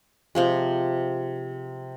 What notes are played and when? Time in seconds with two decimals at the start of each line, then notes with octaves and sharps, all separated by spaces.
0.35 C3 F3 G#3